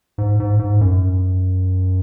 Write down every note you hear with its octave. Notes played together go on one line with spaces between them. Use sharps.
G#2
G#2
G#2
F#2